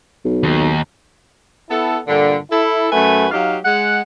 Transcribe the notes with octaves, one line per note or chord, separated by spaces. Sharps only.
B1
D#2
B3 E4 A4
G2 A#2 D3
E4 A4
F#2 A3 F#4 B4 G#5
F#3 D#4 G4 F5
G#3 F#5